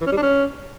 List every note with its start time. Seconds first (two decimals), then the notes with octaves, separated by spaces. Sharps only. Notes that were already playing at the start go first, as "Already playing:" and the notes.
0.01 E3
0.06 C#4
0.12 G3
0.17 D4
0.22 C#4